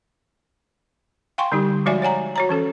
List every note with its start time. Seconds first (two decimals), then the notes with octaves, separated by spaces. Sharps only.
1.38 F5 G5 G#5 C6 C#6
1.52 D3 G3 D#4 G4
1.86 F3 G#3 F#4 D5 E5 G#5
2.02 C#5 F#5 G#5 A#5
2.36 F#4 C#5 A#5
2.49 E3 C#4 A4